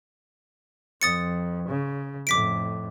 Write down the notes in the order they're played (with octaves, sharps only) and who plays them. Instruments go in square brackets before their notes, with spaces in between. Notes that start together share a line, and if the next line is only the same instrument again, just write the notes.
[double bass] F2 [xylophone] D#6 A6 C#7
[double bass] C#3
[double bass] F2 A2 [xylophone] D6 B6 D7